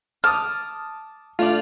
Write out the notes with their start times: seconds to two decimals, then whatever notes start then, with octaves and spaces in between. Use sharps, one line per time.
0.24 A5 D6 D#6 F6
1.39 A3 D4 F4 D5